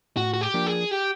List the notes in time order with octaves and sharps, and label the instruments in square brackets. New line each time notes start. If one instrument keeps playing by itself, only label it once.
[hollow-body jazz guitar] A2 [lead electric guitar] F#4
[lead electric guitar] F#4
G4
[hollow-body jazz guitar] F3 A#3 D4
[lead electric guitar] G#4
G4